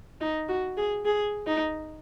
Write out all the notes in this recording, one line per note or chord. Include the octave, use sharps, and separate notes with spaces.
D#4
F#4
G#4
G#4
D#4